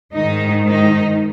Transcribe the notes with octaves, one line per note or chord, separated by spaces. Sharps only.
G#2 D#3 D#4
D#4